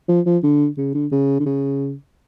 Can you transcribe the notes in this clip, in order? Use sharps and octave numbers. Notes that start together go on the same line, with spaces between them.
F3
F3
D3
C#3
D3
C#3
D3
C#3